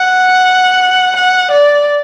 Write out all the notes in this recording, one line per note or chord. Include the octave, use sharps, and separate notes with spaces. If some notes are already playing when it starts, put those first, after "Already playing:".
Already playing: F#5
F#5
D5